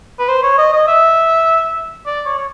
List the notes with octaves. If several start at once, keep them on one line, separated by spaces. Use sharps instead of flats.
B4
C5
C#5
D#5
D#5
E5
D5
C#5
C#5